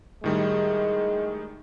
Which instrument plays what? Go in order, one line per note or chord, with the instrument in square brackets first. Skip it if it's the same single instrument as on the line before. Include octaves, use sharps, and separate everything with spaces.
[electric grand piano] A2 D#3 G3 [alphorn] G#3